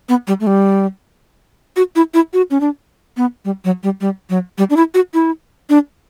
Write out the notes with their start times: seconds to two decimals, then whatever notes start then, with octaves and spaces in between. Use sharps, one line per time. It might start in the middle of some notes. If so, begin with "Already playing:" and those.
0.09 B3
0.27 G3
0.40 A3
0.47 G3
1.76 F#4
1.96 E4
2.14 E4
2.33 F#4
2.51 C#4
2.61 D4
3.17 B3
3.45 G3
3.65 F#3
3.83 G3
4.01 G3
4.30 F#3
4.58 G3
4.70 D4
4.77 E4
4.94 F#4
5.14 E4
5.70 D4